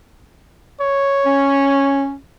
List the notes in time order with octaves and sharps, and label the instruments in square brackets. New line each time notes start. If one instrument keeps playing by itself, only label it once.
[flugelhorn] C#5
[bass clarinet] C#4